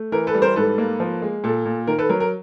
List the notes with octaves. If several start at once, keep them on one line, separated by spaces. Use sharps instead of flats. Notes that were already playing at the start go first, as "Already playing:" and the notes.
Already playing: A3
E3 A#4
A4 B4
G3
A#4 C5
G#2 A4 B4
A#3
F3
G#3
A#2 A4
A#2
D#3 A#4
A4 B4
F#3 A#4
A#4